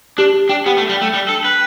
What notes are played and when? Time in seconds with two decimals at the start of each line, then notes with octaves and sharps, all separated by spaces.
0.18 D4 G4
0.34 G4
0.49 D4 G5
0.66 B3 G4
0.77 A3
0.81 G5
0.89 G3
0.97 A3 G5
1.13 G3 G5
1.29 D4 A4
1.45 B4 G5